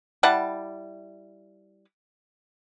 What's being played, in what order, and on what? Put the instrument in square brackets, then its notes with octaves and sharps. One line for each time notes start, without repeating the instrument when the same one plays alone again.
[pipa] G3 E4 F#5 A5